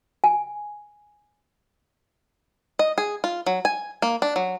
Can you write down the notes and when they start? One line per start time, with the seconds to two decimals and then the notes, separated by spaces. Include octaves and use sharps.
0.24 G#5
2.79 D#5
2.98 G#4
3.24 F4
3.46 F#3
3.65 G#5
4.02 A#3
4.22 D4
4.36 F#3